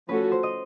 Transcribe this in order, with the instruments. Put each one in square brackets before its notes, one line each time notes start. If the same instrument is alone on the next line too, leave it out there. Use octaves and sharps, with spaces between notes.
[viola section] F3 A3 C#4 F#4 A4 [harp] B4
[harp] C5
D#5